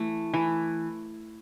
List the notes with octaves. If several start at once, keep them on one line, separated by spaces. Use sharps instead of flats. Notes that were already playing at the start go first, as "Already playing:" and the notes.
Already playing: E3 A3
E3